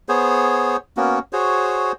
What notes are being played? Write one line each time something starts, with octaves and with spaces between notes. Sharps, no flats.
B3 G#4 C5 C#5
A#3 B3 C#4 F#4
F#4 G#4 C5 C#5